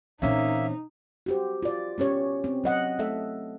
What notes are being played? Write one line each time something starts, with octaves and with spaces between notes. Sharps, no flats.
A#2 E3 A#3 C4 C#4 D#4 E5
F#4 G4 C5
F4 D5
B3 C#4 G4 C#5
C4
F#3 D#5 F#5
A3 A4 E5